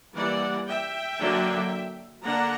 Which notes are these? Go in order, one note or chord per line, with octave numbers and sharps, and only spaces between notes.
E3 G3 A#3 D5 F#5
E5 G5
D3 F#3 A#3 D4
D3 A#3 D4 F#5 A#5